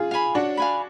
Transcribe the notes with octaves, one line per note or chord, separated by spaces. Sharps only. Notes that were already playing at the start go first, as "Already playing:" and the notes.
Already playing: F4 G#4
F5 G#5 B5
D4 F#4 C#5
F5 G#5 B5